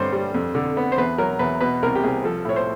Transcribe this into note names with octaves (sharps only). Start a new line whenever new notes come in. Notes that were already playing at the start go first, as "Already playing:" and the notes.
Already playing: G2 D3 C5 C#5
G3
F2
D3
B3
C5
E2 B4
F#3 A#4
E2 B4
B2 B4
C2 A#4
G4
C2 G#4
F3 A4
A2 C#5
C5